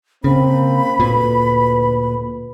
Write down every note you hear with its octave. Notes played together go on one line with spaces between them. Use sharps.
C#3 A#3 C4 B5
D2 A#2 B4